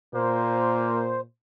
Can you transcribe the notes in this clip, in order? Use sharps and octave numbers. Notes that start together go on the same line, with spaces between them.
A#2 A#3 C5